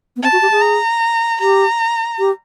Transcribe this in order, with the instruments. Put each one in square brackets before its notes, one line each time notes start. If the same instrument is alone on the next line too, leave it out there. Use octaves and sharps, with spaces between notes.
[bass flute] B3
[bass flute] C4 [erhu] A5
[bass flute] F#4
G4
G#4
[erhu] A#5
[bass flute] G4 [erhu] A#5
[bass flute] G4